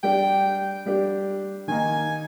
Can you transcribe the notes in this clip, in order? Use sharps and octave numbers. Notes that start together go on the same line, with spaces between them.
G3 D4 G4 G5
G3 D4 G4
D#3 A#3 D#4 G#5